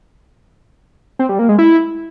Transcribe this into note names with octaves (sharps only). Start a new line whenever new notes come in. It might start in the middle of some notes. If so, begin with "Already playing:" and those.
C4
G3
A#3
G#3
E4